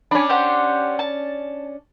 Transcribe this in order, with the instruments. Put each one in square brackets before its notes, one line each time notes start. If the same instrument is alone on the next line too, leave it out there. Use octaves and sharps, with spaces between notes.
[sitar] C#4 D4 [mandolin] G#5 B5
[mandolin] G4 C5 F#5
A5